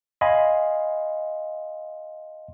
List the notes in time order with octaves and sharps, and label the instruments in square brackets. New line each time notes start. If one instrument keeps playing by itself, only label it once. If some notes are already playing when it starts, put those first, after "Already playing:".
[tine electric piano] D#5 F5 G#5 B5 C6